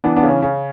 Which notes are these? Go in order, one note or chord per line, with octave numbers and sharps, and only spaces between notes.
E3 B3 D4
B3 D4
C#3
C#4
C#3 C#4